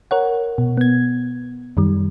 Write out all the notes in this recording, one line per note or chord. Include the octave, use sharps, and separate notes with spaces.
A#4 C#5 F#5
B2
B3 G#6
F#2 D#3 G3